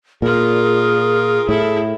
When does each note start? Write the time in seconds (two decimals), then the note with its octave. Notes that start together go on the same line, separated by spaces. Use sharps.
0.22 A#2 F4 G#4 A#4
1.49 A2 E4 A4